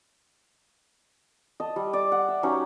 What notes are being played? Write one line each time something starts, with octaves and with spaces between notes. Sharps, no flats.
D#5 A5
G3
D5
F#5
E5
F#3 C#4 D#4 G4